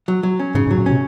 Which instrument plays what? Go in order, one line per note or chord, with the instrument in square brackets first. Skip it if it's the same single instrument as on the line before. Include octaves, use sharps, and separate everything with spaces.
[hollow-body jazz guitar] F#3
F#3
C#4
[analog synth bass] G#2 [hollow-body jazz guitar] C#3
[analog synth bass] G#2
[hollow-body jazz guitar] F#3
[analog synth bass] A#2
[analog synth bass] C3 [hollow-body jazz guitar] C#4